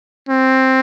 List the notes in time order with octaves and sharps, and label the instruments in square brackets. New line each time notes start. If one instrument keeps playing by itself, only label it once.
[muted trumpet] C4